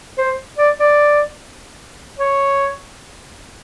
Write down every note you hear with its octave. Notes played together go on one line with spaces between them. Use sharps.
C5
D5
D5
C#5